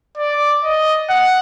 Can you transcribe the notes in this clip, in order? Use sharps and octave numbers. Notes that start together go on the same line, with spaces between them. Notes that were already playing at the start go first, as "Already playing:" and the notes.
D5
D#5
F#5